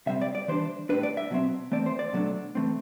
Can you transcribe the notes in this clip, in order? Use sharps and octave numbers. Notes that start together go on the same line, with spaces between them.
C3 G3 C4 E5
D5
D5
E3 G3 D4 C5
A2 G3 D4 B4
D5
E5
B2 F#3 C4
E3 A3 C4 D5
C5
D5
B2 F#3 A3 D4
E3 A3 C4